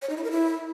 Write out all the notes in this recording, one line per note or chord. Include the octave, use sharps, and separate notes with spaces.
C#5
D#4
E4
A#4
E4